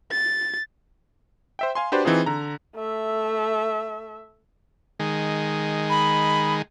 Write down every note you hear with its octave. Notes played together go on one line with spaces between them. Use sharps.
A6
C5 E5 G5
F5 G#5 C6
D4 F#4 G4 B4 C5 D5
E3 C4 D#4 F4 G#4
D3 A#5
A3 E5
D#3 G#3
B5